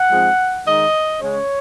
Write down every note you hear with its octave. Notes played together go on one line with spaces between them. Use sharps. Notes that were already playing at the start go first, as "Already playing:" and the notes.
Already playing: F#5
G#2 F3 G#3 C4
D#3 G#3 D#4 D#5
C#3 G#3 C#4 C#5